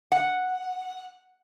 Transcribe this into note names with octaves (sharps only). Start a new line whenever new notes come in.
F#5